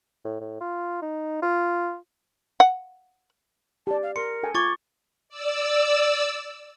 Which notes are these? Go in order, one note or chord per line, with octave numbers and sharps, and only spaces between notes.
A2
A2
F4
D#4
F4
F#5
G4 D5 A5
F5
A#4 C6 C#7
A4 G5 G#5
F4 C#6 D6 G#6 A6
D5 E6